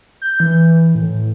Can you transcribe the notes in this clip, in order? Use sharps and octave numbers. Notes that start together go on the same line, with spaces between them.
G6
E3
A2